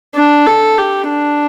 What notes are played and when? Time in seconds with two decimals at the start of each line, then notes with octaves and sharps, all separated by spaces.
0.15 D4
0.46 A4
0.78 G4
1.10 D4